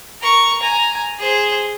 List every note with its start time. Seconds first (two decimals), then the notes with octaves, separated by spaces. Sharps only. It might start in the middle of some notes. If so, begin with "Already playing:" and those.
0.22 A#4 C#6
0.62 G#5 A#5
1.19 G#4 C5